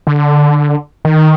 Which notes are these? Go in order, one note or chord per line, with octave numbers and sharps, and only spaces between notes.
D3
D#3